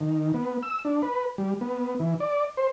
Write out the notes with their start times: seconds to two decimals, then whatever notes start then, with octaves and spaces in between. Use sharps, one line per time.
0.01 D#3
0.34 B3
0.63 E6
0.85 D4
1.02 B4
1.38 G3
1.61 B3
1.99 E3
2.20 D5
2.57 C5